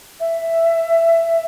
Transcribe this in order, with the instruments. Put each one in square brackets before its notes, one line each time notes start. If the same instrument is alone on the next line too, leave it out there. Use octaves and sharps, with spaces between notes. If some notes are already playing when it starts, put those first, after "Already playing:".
[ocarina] E5